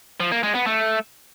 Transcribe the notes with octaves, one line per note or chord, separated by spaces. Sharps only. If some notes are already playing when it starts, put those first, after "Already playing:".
F3
A#3
G#3
B3
A3